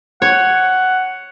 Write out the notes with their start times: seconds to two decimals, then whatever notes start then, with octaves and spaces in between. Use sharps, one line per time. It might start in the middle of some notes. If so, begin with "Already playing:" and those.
0.22 C#5 F#5